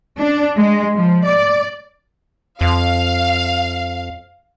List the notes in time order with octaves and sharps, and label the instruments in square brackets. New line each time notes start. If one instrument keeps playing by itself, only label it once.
[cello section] D4
G#3
F3
D5
[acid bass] F2 [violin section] F5